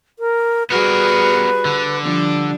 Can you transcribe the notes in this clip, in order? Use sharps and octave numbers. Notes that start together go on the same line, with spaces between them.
A#4
G3 B3 F#4 G#4 A#4 B4
D3
F3 G3 D4